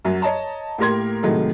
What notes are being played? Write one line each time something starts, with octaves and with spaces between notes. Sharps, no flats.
F#2 F#3
C#5 D#5 A5 A#5
A2 A#3 G4 A#4 C6 G#6
A2 C3 D#3 F#3 G#3 A3